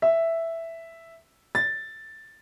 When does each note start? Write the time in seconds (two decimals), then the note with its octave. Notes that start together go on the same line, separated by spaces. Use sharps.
0.02 E5
1.55 A6